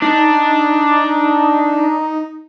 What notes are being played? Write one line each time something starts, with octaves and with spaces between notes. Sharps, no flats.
D4 D#4